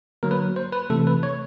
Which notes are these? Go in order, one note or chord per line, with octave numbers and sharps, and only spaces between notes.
D3 F#3 A#3 A#4
B4
C5
B4
C3 E3 A3 A4
B4
C#5